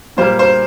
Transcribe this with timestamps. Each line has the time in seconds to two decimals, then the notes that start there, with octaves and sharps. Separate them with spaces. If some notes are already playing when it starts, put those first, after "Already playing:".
0.17 A#2 G3 A#3 C5
0.39 C5